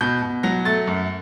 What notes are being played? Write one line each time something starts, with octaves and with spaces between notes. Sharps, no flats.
B2 G6
B2
F#3 A#6
A3 A6
F#2